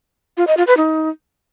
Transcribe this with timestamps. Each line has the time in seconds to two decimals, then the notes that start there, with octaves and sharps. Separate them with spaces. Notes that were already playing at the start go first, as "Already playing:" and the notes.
0.37 F4
0.47 D#5
0.57 F4
0.67 B4
0.77 D#4